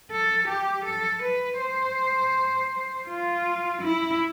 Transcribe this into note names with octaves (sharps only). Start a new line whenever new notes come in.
A4
G4
A4
B4
C5
F4
E4